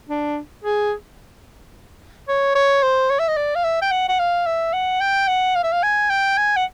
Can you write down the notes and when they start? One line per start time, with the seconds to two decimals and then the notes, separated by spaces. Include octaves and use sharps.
0.09 D4
0.64 G#4
2.28 C#5
2.55 C#5
2.83 C5
3.10 C#5
3.19 E5
3.28 D#5
3.37 D5
3.56 F5
3.64 E5
3.82 G5
3.92 F#5
4.09 F#5
4.19 F5
4.46 E5
4.73 F#5
5.01 G5
5.28 F#5
5.55 F5
5.64 E5
5.72 F5
5.83 G#5
6.10 G5
6.38 G#5
6.57 F#5